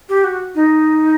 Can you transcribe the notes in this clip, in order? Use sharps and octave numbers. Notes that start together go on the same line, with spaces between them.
G4
F#4
D#4